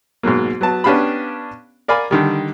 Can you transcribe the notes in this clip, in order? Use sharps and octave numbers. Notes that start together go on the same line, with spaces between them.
G#2 B2 F#3 A#3
F#3 B3 A5
B3 C#4 D4 G4 F5 B5
A#4 D5 F5 G#5 B5
D3 D#3 G3